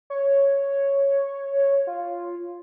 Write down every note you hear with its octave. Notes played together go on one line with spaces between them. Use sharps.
C#5
F4